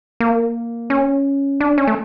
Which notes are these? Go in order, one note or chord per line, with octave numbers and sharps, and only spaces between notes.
A#3
C#4
D4
C#4
A3